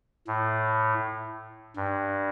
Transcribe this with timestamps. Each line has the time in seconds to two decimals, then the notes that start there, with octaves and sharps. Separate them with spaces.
0.27 A2
1.76 G2